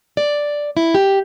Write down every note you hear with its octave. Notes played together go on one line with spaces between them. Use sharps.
D5
E4
G4